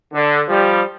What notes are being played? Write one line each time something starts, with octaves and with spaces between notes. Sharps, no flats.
D3
F3 G3